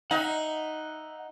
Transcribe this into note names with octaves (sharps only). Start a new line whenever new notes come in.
D#4 E5 F#5